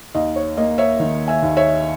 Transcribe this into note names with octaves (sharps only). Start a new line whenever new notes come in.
D#2 D#5
C#5
A#3 D#5
C#5 E5
D#3
E5 G#5
D#2
C#5 E5